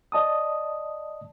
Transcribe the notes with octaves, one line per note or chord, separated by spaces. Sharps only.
D5 D#5 A5 D#6